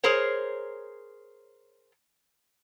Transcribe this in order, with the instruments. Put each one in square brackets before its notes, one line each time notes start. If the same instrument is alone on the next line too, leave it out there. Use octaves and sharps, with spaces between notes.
[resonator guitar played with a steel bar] G#4 A#4 C5 C#5